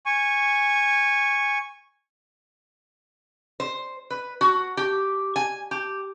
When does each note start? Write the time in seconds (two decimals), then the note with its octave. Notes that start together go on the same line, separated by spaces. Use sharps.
0.06 G#5 C#6
3.60 C5
4.10 B4
4.41 F#4
4.77 G4
5.36 G#5
5.71 G4